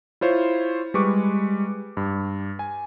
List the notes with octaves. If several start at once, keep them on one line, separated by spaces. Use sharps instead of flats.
E4 F4 C5 C#5
G3 G#3 B4 C#6 D6
G2
G#5